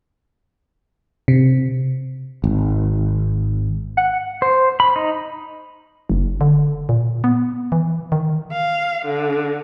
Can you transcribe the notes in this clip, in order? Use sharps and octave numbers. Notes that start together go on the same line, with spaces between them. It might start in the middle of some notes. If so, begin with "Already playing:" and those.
C3
G#1
F#5
C5
B5
D#4
F#1
D3
A#2
B3
E3
D#3
F5
D3